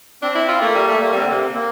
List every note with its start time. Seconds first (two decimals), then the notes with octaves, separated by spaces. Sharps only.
0.22 C4 D4
0.35 E4
0.48 F4
0.61 A3 A#3
0.74 G3
0.88 A3
1.01 G3 A#3
1.12 G3 C4
1.21 D3
1.27 C3 A#3
1.41 C4
1.55 A#3